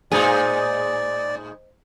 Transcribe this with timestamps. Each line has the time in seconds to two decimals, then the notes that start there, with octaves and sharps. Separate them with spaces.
0.12 A2 G#3 D#4 G#4 C5 D5 D#5